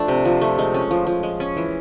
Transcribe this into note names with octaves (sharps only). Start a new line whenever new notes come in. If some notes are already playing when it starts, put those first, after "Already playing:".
Already playing: F3 A3 D4
C3
F3
A3
G#3
C#4
F3
F3
G#3
C#4
E3